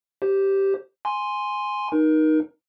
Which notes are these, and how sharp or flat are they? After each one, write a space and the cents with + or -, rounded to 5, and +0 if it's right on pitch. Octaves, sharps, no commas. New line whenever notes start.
G4 -5 C5 +0
G#5 +0 C6 +0
D#4 -5 A#4 +30